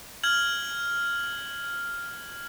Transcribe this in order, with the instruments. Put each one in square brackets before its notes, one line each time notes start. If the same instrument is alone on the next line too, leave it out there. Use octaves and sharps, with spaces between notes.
[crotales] F6 G#6 F#7